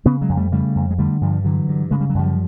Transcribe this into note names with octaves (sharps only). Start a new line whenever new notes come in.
C#3 B3 C#4
F#3 G#3
F2
G3 A3
C#3 G3 A3
F2
G#3
D3 G3 A3
G2 F3 G3
D3 E3 F#3
G2
C#3 G#3
G3
F#3
F#2 F3 G3